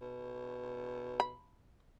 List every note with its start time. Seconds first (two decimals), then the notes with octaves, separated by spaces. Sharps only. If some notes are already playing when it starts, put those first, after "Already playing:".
0.01 B2
1.20 B5